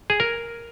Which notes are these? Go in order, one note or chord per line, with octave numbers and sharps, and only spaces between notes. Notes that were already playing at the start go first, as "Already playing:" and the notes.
G#4
A#4